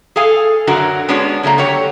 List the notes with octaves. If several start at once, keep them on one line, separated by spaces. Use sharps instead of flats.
G#4 A4 F5 G#5
F#2 D3 F#3 F#4 A#4
G#3 B3 C#4 D4 F#4 C#5
C#3 F#3 A3 A#3
D3 F#3 F#4 G4 C#5